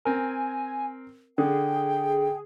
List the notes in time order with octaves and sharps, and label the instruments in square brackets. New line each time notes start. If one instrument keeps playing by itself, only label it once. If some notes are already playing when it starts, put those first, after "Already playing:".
[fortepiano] C4 A#4 [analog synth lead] G#5
[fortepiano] D3 [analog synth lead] G#4 [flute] G5